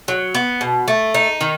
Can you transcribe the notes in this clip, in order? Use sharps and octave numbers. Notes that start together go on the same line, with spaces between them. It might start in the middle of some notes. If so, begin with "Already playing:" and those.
F#3
B3
B2
A3
D#4
D#3